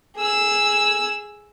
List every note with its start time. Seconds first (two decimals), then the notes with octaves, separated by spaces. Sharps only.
0.16 G#4 E6